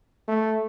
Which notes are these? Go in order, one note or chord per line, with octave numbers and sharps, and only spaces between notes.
A3